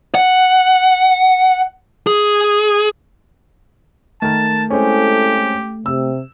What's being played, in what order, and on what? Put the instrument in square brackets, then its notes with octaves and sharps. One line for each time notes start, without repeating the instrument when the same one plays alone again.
[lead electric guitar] F#5
G#4
[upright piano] D#3 A#4 [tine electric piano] A3 [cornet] A5
[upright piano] G#3 C4 C#4 [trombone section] E4 A4 [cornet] G4
[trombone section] C3 [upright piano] E6